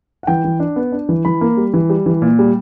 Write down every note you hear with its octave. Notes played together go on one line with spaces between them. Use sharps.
F#5
E3 G5
E3
D4
B3
D4
E3
E3 B5
A#3
G3
E3
G3
E3
A#2
G3